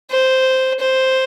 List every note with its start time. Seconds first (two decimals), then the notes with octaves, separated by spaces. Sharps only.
0.11 C5
0.80 C5